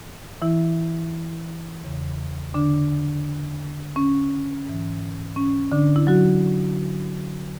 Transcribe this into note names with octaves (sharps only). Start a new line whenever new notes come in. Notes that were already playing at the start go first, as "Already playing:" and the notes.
Already playing: G#2 E3
E3 E4
E2 C#3 E3
D3 D4
C#4
G#2 E3
C#4
D3 D4
E4
F#3 F#4